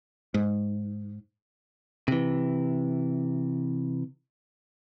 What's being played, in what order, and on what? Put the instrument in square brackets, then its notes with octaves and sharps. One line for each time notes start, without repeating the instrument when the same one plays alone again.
[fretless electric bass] G#2
[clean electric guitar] C3 E3